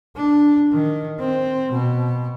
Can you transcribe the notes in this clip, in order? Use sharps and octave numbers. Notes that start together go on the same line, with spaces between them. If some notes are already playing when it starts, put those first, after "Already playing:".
D4
D#3
C4
B2